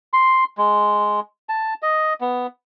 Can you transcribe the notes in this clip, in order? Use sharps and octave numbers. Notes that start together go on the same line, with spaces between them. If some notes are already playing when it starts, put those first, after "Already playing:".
C6
G#3
A5
D#5
B3